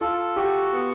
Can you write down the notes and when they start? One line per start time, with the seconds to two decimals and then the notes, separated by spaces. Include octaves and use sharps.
0.01 F4 A4
0.36 F#4 G4
0.72 B3